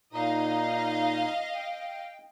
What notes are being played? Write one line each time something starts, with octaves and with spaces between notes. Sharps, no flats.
A#2 D#4 D#5 F5
G5